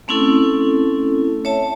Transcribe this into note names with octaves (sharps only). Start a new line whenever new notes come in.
A3 C4 C#4 E4 A4
C#5 E5 A5